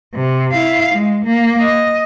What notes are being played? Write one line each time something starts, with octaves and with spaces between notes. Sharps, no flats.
C3
E4 F5
G#3
A#3
D#5